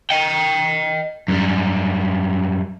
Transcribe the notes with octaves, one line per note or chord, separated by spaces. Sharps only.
D#5 G5
F#2 G3